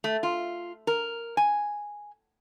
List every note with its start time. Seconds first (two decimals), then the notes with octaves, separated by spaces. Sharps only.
0.04 A3
0.23 F4
0.87 A#4
1.37 G#5